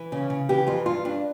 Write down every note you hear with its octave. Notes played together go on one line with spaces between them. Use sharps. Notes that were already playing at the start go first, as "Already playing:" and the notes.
Already playing: E3
C#3 C#4
C#3
E3 G4
F2 F4
G2 F4
G2 D4